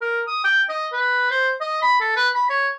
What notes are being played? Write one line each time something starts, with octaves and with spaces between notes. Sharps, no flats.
A#4
D#6
G5
D#5
B4
C5
D#5
B5
A4
B4
B5
C#5